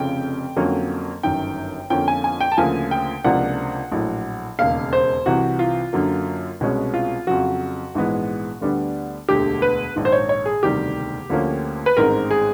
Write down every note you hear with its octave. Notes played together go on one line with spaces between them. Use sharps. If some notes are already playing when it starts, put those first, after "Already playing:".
Already playing: F1 F2 C#3 G5
F2 D3 F#3 A#3 C#4
G1 F#2 D#3 G5
F2 D3 F3 A#3 C#4 G5
G#5
G#5
G5
A5
D2 C#3 F3 A#3 G#5
G5
C#2 C3 F3 A#3 D4 F#5
A#1 A2 F#3
E1 D#2 C#3 F5
C5
C2 C3 E3 F#4
F4
F#2 D3 F#3 A#3
C2 B2 G#3 C#4
F4
F2 C#3 F#3 F#4
A#1 G#2 E3 G#3 B3
D2 D3 G3 B3 D4
E1 D2 D3 G4
B4
A#1 G#2 D#3
C5
C#5
C#5
G#4
E1 D2 C3 D#3 G3 G4
D2 D3 F3 A#3 C#4
B4
A1 G#2 D#3 G#3 C4 A#4
G#4